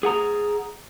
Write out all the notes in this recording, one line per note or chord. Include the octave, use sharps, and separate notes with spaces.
G#4 F#5 A#5